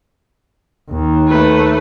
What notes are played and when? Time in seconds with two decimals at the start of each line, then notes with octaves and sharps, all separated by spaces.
0.91 D#2
1.28 A3 B4